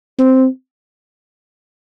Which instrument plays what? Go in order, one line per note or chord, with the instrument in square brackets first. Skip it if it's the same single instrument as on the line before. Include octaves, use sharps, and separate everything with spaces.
[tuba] C4